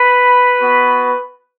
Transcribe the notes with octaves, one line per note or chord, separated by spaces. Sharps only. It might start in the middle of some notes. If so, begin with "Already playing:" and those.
Already playing: B4 B5
B3 F#4